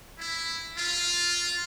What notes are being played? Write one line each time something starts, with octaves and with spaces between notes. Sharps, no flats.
E4
F4